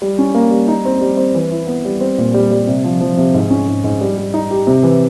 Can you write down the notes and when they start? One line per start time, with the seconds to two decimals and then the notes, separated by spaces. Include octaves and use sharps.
0.02 G3
0.18 C#4
0.34 A#3
0.51 G3
0.68 D#4
0.85 C4
1.01 G3
1.17 C4
1.35 E3
1.51 E4
1.67 B3
1.85 G3
2.01 C4
2.18 A#2
2.34 G3
2.51 G3
2.67 C3
2.84 F3
3.01 F3
3.18 C3
3.34 G#2
3.50 C#4
3.68 G#2
3.84 G#2
4.01 G3
4.18 G3
4.34 D#4
4.51 G4
4.67 C3
4.83 E3